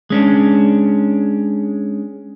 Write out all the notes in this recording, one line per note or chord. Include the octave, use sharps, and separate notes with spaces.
G#3 C#4 D4